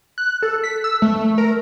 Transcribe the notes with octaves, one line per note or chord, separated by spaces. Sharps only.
F#6
A4
B6
E6
A3
A#4